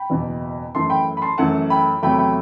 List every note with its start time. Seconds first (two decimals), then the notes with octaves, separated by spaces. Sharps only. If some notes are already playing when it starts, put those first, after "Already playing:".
Already playing: G5 B5
0.10 F#1 E2 B2
0.75 F#2 E3 A3 A5 C6
0.90 G5 B5
1.17 B5
1.22 A5 C6
1.38 F#2 E3 A3 F#5 A5
1.70 G5 B5
2.02 E2 C3 F#3 A3 G5 B5
2.18 G5 B5